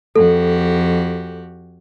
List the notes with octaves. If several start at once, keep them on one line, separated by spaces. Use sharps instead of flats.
F2 F#4 G4 A4